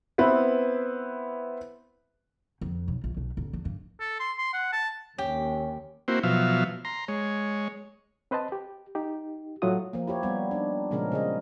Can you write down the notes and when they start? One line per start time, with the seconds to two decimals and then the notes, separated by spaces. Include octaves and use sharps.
0.18 B3 C4 E4 B4
2.61 F2
2.88 B1
3.04 A#1
3.17 B1
3.37 D1
3.53 E2
3.65 G2
4.00 A4
4.20 C6
4.38 C6
4.54 F#5
4.73 A5
5.18 D#2 C#4 G4
6.08 A#3 C4 E4 F#4 C5
6.23 B2 F3 F#3 E5 F5
6.85 A#5 C6
7.08 G#3 C#5
8.31 C4 B4 C5 D#5 A5
8.52 G4
8.95 D#4 G4
9.62 A2 F#3 A3 F4 F#4 D#6
9.93 F3 A#3
10.07 E4 G4 C#5
10.23 G3 B3
10.51 D4 D#4
10.91 A#2 C#3 F3 G#3 C#4 A#4
11.12 C#3 G#4 D#5